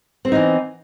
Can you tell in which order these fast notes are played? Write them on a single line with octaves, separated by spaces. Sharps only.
C4 B3 D#4 E3